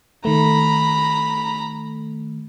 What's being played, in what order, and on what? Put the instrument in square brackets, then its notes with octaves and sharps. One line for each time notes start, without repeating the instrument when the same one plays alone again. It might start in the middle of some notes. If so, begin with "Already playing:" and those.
[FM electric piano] D#3 A3 [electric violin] A#5 B5